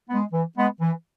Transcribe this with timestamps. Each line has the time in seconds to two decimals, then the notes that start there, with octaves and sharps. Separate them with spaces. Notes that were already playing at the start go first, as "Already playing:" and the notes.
0.08 G#3 B3
0.32 E3
0.56 G#3 B3
0.81 E3